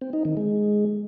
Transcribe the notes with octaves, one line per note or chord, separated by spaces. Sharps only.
C4
D#4
D#3
G#3